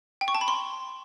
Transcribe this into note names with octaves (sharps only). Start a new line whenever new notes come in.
G5
C#6
A5
B5
C6